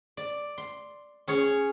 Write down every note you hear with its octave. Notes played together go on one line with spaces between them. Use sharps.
D5
C6
C#4 G#4 C#5